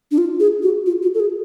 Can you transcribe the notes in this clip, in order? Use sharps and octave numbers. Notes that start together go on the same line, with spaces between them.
D4
F4
G#4
F#4
F4
F#4
A4
G#4